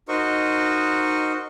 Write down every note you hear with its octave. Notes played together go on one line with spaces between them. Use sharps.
D#4 F#4 A#4 C5 D#5 C#6